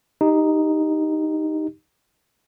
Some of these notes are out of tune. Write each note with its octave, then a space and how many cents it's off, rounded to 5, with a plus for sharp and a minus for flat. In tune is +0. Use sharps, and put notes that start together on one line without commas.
D#4 +0 G4 +0